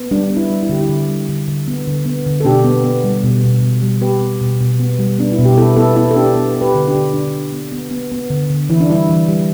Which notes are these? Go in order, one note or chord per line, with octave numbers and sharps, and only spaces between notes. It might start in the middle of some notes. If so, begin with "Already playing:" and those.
Already playing: B3
G3 D4
B3
E4
G3
E4
D3 G4
E4
D3
G3
D3
D3
B3
D3
B3
D3
A4
B2 D4 G4
B3
B3
G3
B2
B2
B2
G3
B3 G4 B4
B3
B2
B2
B3
G3
B3 D4
E4
B2
G4
B3 E4 A4
B3 E4 A4
B3 E4
A4
B3 D4 G4
B3
B3
G4 B4
D3
D4 G4
D3
D3 D4
D3
B3
B3
B3
B3
D3
D3
E3 E4
D4
G3 E4
E3
G3